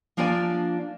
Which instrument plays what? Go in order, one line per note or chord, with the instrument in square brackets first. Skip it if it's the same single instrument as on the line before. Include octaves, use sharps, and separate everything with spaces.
[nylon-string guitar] F3 A#3 D4 F4 D5 G#5